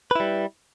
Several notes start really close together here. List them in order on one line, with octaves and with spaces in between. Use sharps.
B4 E4 G3